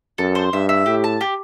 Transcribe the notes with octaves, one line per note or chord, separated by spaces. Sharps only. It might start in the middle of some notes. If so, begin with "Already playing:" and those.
F#2 A4
C5
G2 E5
E5
A2 G4
A5
G4